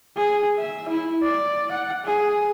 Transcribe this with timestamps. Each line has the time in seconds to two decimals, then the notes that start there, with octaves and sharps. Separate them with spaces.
0.16 G#4
0.58 E5
0.89 E4
1.22 D5
1.71 F#5
2.05 G#4